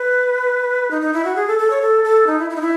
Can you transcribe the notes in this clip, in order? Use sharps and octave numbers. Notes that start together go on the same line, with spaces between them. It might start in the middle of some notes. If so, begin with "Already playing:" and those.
Already playing: B4
D#4
D#4
E4
F#4
G#4
A4
A4
C#5
A4
A4
D#4
E4
E4
D#4
E4